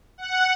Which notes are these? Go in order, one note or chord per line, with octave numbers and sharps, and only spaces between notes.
F#5